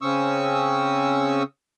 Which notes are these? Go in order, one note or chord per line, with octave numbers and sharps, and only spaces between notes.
C#3 C4 C#4 C#6 D#6 E6